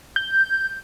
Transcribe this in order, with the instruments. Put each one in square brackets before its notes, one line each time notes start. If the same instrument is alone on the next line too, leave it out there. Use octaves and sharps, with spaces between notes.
[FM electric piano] G6